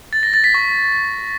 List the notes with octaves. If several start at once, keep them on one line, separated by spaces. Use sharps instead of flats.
A6
A#6
A6
B6
C#6